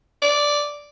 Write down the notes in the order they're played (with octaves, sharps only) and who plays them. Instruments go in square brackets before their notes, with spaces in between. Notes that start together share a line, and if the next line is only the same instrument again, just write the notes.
[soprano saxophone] D5